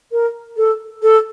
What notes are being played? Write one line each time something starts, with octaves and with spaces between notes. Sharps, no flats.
A#4
A4
A4